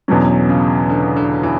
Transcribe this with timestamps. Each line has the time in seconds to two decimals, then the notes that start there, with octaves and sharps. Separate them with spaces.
0.08 E2 B2 D3 F#3 C#4
0.49 C#3
0.89 D3
1.16 D3
1.43 E3